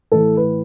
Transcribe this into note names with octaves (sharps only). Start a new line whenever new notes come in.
A2 E3 A4
B4